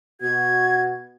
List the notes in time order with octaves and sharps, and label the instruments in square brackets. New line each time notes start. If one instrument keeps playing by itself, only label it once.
[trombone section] B2 F#4 [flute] G#6